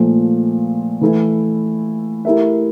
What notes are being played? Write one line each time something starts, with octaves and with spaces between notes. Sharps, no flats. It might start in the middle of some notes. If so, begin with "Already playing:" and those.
Already playing: A#2 F3 A3
E3 A3 E4
A3 E4 G4 A#4 E5